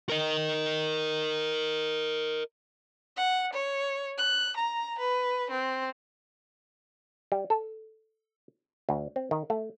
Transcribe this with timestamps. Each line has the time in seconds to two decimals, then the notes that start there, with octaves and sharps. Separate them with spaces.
0.09 A#4 D#5
3.17 F#5
3.53 C#5
4.18 F#6
4.57 A#5
4.99 B4
5.50 C4
7.32 G3
7.50 A4
8.89 D2
9.16 C4
9.31 D#3
9.50 A3